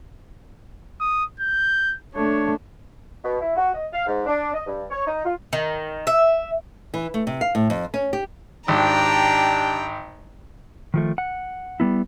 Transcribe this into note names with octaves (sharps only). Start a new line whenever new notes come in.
D#6
G6
A3 D4 C#5
B2
E4
F#4
D#5
F5
G#2
D4
D#5
G2
C#5
D#4
F4
D#3
E5
E3
A3
C3
F5
A2
F2
C#4
G4
G#1 D4 G4 G5 A#5
D#3 F3 A3
F#5
G3 G#3 B3 E4